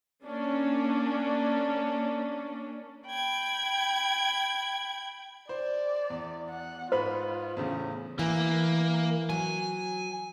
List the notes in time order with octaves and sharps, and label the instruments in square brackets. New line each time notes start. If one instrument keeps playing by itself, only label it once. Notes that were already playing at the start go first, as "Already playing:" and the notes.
[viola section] A#3 C#4 D4
[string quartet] G5 B5 G#6
[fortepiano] C5 [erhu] D5
[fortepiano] E2
[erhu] F#5
[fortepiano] G#2 B4 B5 [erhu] F4 [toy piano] C5
[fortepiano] E2 A2 C#3
[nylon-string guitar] E3 [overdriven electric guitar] A#3
[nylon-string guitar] F#3 [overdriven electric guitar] G#5